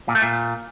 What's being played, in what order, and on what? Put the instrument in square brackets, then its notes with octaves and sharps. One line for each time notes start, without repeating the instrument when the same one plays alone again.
[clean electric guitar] A#2
A3
A#2